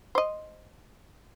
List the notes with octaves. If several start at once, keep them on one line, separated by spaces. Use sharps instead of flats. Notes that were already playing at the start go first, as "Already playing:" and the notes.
C5 D#5